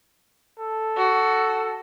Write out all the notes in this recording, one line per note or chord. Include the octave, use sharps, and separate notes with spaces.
A4
F#4